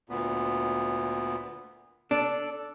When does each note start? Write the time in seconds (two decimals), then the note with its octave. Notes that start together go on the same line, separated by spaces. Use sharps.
0.09 D2 A#2 B3
2.11 D4 A4